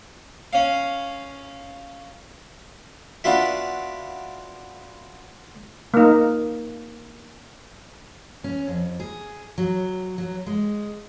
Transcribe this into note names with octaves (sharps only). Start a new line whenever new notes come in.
C#4 F5
B3 D4 F4 F#4 E5
A#3 D#4
C#4
F2
G#4
F#3
F#3
G#3